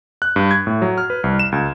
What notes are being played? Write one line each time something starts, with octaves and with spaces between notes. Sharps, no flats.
F#6
G2
G#6
A2
F#3
F6
B4
C2
E7
C#2